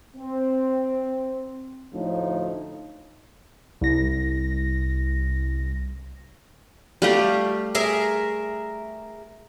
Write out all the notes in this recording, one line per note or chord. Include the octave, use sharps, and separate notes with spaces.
C4
D2 A2 F3 D#4
C2 A#6
G3 A3 G4 F5
G#4 A#4 E5